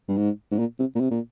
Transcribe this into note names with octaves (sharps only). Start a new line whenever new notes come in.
G2
G#2
G#2
A#2
C3
A#2
C3
A#2